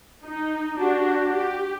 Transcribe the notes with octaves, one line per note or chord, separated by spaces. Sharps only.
D#4
D4 F#4 G4
G4